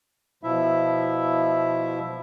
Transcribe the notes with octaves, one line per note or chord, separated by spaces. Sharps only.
B2 F3 E4 E5